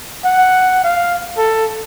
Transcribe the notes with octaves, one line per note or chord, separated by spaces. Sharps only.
F#5
F5
A4